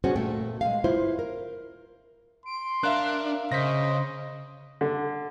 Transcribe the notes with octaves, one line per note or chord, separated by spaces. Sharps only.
B3 C#4 D4 F#4 G#4 C5
A#2 A3 G5
G#3 F5
E4 F4 C5
A#4
C6 D7
D4 A#4 E5 F5 F#6
C#3 C5 D#5 A#6 B6
D3